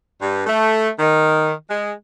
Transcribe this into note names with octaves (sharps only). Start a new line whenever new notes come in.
G2
A3
D#3
G#3